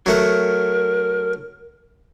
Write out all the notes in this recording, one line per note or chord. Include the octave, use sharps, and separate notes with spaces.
F#3 A3 A#4 F#5